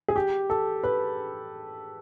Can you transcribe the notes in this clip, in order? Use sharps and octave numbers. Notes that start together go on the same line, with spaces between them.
G#4
G4
A4
B4